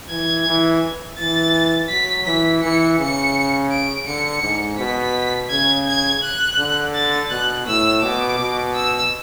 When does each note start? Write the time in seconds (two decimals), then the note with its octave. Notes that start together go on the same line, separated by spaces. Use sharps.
0.10 E3 G#6
0.47 E3
1.19 E3 A6
1.90 F#3 B6
2.26 E3 B6
2.63 E3 C#7
2.98 C#3 C#7
3.71 D7
4.07 D3 C#7
4.43 G#2
4.79 B2 B6
5.50 C#3 G#6
5.87 G#6
6.24 F#6
6.59 D3
6.95 A6
7.31 B2 F#6
7.67 A2 E6
8.02 B2 D6
8.39 B2
8.75 E6